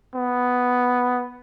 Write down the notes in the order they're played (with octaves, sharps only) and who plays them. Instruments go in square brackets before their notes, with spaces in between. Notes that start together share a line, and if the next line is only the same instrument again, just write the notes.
[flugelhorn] B3